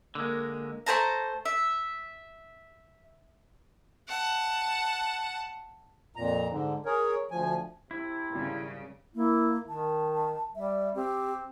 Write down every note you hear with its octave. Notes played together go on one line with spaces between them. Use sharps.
D3 G#3 A#3 A#4
A3 C5 A5 A#5
E5
F#5 A5
F2 A#2 A#5
G#2 D3
G#4 A#4 C#5
D2 F3 G#5
C3 E4
G#1 C#3 G3
A#3 E4
D#3 A5
G3 E5
C4 G4